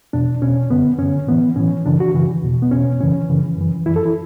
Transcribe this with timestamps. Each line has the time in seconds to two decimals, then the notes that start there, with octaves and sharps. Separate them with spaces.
0.13 E2 B2 D4
0.42 E2 B2 C#4
0.70 F#2 D3 B3
0.99 F#2 D3 C#4
1.27 A2 E3 B3
1.56 A2 E3 C#4
1.86 F#2 C#3 E3 D4
2.00 F#4
2.14 F#2 C#3 E3
2.43 E2 B2
2.62 B3
2.71 E2 B2 C#4
3.00 F#2 C#3 E3 C#4
3.29 F#2 C#3 E3
3.57 F#2 E3
3.86 F#2 E3 E4
3.96 A4
4.05 E4